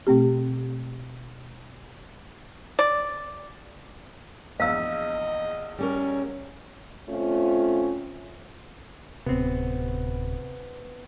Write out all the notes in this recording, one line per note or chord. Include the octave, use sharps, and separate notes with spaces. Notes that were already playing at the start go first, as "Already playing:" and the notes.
B2 A3 C4 G4
D5
A#1 E2 D#5 F5 E6
G3 C#4 A#4
A3 C4 C#4 F4
D1 C3 B3 C4